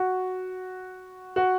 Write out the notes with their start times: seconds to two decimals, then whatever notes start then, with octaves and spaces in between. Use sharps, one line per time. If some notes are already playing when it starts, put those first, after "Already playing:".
Already playing: F#4
1.36 F#4